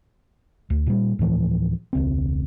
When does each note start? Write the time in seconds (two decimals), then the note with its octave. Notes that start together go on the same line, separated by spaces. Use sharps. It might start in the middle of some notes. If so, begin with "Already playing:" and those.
0.70 D2
0.86 A#2 G3
1.19 D2 A2 E3 F3
1.93 E1 C#2 C4